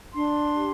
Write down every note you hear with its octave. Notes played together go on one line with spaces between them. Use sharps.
D4 C6
G4